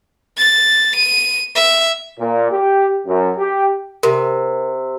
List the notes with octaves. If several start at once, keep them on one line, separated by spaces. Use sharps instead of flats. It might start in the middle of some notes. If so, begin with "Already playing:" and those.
A6
D#7
E5
A#2
G4
F#2
G4
C3 A#4